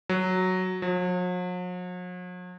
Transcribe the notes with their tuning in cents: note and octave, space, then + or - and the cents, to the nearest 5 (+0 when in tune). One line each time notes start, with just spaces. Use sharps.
F#3 +0
F#3 -45